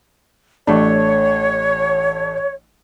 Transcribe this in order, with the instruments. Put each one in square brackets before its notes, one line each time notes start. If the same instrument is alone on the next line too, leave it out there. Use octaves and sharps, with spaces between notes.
[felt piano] A1 A3 D4 [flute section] C#5